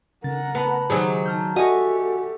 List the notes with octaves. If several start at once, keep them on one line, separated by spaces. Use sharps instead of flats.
C#3 A#4 F#5 A6
B3 B4 A5 B5
D#3 F#3 G#3 D#4 G4 G#4 C5
A5 F6 G6
F#4 G4 A4 D#5 E5 F#5 G#5 C#6